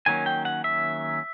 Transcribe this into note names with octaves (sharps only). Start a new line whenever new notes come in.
D#3 F#3 A#3 C#4 G#5
G5
F#5
E5